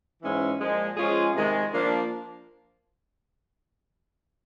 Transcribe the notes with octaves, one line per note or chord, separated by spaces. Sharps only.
G#2 E3 G#3 C#4 E4
A#2 F3 G#3
F3 G#3 C#4 F4 G#4
C3 D#3 G#3
F3 A#3 D4